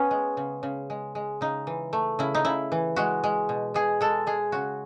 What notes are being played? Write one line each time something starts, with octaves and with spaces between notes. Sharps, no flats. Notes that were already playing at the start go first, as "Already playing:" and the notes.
Already playing: B3 C#4
G#3
C#3
C#3
G#3
G#3
C#3 D#4
E3
A3
C#3 E4
D#4
C#3 E4
E3
G#3 F#4
G#3
B2
B2 G#4
G#3 A4
G#3 G#4
C#3 F#4